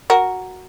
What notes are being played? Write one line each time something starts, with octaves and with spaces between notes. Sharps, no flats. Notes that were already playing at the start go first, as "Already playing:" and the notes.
F#4 A#4